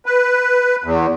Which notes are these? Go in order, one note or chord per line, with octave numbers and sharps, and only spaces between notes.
B4
E2